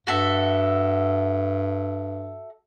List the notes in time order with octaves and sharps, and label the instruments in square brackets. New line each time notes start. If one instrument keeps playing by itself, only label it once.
[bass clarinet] G2 [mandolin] F#4 A4 E5